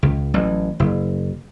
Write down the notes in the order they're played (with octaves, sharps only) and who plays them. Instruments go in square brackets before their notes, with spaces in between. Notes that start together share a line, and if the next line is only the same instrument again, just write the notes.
[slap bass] C#2
A1 F#3
F#1